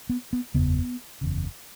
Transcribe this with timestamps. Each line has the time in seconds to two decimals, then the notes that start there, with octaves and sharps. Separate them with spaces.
0.09 B3
0.33 B3
0.54 F#1 E2 C#3 B3
1.21 F#1 E2 C#3